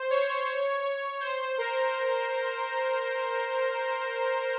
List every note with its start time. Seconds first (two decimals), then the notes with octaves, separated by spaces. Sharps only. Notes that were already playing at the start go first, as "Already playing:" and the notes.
Already playing: C5
0.10 C#5
0.83 C#5
1.20 C5
1.58 A#4